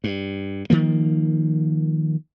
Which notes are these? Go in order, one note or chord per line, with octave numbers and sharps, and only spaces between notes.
G2
D#3 F3 A#3